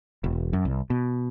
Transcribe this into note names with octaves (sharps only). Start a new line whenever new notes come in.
E1
F#2
C2
B2